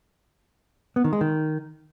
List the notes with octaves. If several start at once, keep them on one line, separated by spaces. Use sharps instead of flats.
B3
D#3
G#3
D#3